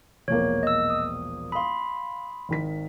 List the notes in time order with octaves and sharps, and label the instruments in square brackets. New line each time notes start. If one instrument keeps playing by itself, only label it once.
[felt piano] E1 A#1 A#3 [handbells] C#5
[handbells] D#5 E6
D#6
[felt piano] F5 D#6 [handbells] B5 C6
[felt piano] G#1 D#3 B6